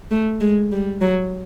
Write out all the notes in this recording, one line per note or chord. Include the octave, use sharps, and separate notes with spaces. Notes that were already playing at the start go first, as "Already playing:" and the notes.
A3
G#3
G3
F#3